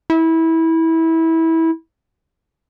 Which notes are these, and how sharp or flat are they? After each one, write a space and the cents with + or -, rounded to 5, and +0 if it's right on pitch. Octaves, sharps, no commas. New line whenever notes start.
E4 -20